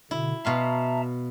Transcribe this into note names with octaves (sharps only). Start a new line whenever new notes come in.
B2 D3 E4
B2 E5 F5 A5 A#5 C6